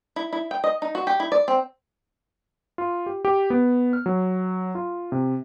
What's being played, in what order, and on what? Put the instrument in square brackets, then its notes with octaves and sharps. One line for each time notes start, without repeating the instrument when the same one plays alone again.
[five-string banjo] E4
E4
G5
D#5
D#4
F#4
G4
E4
D5
C4
[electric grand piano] F4
G4
G4
B3
F6
F#3
F4
C3